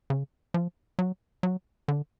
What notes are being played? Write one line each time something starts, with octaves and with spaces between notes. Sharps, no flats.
C#3
F3
F#3
F#3
D3